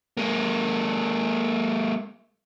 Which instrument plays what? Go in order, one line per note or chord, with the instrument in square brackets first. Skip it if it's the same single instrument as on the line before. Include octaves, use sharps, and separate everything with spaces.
[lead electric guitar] G#3 A#3